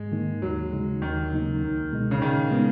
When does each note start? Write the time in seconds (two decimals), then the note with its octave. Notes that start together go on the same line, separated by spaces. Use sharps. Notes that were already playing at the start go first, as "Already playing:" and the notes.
Already playing: G#2 G#3
0.12 D#3 A#3 D#4
0.42 D#2 F#3
0.72 C#3 G#3 D#4
1.02 D#2 D#3
1.31 C#3 F#3 A#3 D#4
1.62 C#2
1.92 B2 G#3 D#4
2.11 C#3
2.21 A#2 D#3
2.51 G#3 B3 D#4